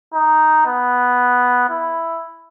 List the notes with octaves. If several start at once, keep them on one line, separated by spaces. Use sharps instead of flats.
D#4
B3
E4